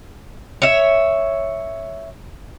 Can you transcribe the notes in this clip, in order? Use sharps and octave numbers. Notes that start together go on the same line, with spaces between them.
C#5 E5